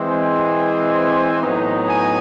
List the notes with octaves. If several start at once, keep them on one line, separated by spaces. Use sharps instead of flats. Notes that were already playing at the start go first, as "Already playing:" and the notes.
Already playing: E3 G#3 C4
G#5
A2 F#3 B3 D#4
G#5